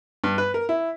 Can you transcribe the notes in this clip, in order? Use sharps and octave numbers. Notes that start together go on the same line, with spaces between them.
G2
B4
A#4
E4